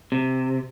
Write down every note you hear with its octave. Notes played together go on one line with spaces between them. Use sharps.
C3